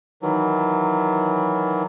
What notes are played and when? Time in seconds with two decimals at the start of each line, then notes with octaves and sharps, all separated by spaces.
0.22 D#3 E3 F#3